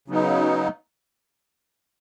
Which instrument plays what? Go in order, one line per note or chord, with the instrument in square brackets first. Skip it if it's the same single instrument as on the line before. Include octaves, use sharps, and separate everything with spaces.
[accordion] C#3 F#3 B3 D#4